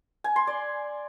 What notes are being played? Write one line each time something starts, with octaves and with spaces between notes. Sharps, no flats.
G#5
C6
D5